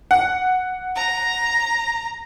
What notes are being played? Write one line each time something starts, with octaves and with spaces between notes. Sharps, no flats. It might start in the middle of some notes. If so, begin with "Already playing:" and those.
F#5
A#5